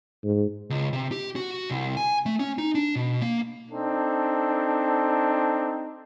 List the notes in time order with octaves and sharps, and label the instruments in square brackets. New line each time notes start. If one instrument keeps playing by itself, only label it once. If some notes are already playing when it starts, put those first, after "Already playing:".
[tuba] G#2
[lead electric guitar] C#2
C3
G4
F#4
C2
G#5
A3
C#4
D#4
D4
B2
A#3
[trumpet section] C4 D4 D#4 A4